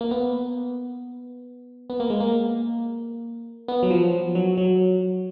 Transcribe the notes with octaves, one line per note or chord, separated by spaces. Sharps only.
A#3
B3
B3
A#3
G#3
A#3
B3
F#3
F3
F#3
F#3